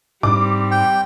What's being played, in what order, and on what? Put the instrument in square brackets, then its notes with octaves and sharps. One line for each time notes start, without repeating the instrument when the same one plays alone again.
[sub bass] G#2 [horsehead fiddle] G3 C4 [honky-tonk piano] D6
[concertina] G5